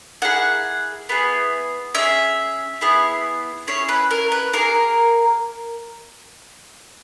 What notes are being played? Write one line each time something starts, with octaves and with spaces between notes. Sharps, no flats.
A#3 E4 G#4 F#5
B3 E4 G#4
C#4 G#4 E5
B3 E4 G#4
C#4 E4 G#4 C#5
B4
A#4
B4
A#3 E4 G#4 A#4